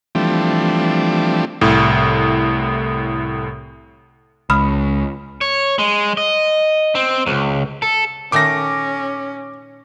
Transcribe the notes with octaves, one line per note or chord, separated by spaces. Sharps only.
E3 F3 G3 A3 C4 D4
C2 A2
C#2 B5 D#6 F6
C#5
G#3
D#5
C4
C#2
A4
A#2 D#3 A3 C#4 D6 A#6